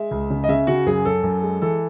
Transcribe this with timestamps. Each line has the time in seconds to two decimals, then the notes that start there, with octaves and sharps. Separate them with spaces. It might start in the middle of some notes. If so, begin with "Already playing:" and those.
Already playing: G#3 E5
0.11 C#2
0.30 C#3
0.44 D#5
0.49 C#3 E5
0.67 C#3 F#4
0.86 F#2 G#4
1.05 F#2 A4
1.23 F#2
1.42 G#3
1.62 E3 A4